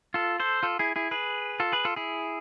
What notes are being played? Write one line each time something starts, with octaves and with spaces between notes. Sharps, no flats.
F4 A4
A4 C5
F4 A4
E4 G#4
E4 G#4
G#4 B4
F4 A4
G#4 B4
F4 A4
E4 G#4